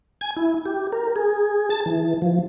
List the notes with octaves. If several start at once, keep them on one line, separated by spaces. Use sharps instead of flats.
G#5
E4
G4
A#4
G#4
A5
E3
F3